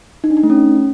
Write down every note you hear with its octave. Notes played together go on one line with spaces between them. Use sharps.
D#4
D4
D#4
A3
C#4